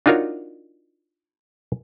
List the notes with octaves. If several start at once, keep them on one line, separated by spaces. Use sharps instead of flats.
D4 D#4 F4 F#4 A#4 C#5